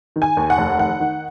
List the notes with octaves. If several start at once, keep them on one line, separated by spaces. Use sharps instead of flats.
D#3
G#5
D#2
F#5
F1
D#3 F#5
D#3